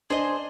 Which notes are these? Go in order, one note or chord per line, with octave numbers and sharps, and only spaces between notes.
D4 G#4 C5 D#5